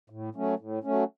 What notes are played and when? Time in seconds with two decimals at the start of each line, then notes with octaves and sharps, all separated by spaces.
0.10 A2
0.35 F#3 A3 C#4
0.59 A2
0.84 F#3 A3 C#4